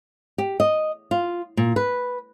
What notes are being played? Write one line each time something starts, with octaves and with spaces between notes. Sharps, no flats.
G4
D#5
F4
A#2
B4